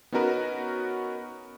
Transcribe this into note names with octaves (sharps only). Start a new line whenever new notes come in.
B3 C#4 D#4 F#4 A#4 B4